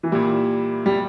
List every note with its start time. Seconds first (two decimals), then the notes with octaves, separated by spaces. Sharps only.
0.03 E3
0.11 A#2 G3 A#3 E4
0.86 G3